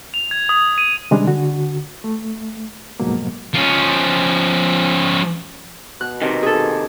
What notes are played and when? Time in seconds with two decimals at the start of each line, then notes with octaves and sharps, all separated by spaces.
0.14 F7
0.31 G#6
0.49 D#6
0.78 D#7
1.11 C3 D#3 G3 G#3 C#4 D4
1.27 D3 F#4
2.04 A3
3.00 F2 G#2 B2 F#3 A#3
3.54 F3 C#4
6.01 B2 F#6
6.22 C3 D#3
6.43 G#4 A4